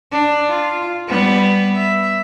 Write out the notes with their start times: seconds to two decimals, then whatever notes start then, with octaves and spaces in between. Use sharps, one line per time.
0.12 D4
0.49 F4
1.08 G3 B3
1.76 E5